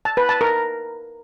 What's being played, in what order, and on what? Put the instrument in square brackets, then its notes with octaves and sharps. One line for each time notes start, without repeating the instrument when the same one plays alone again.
[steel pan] A5
B4
A5
A#4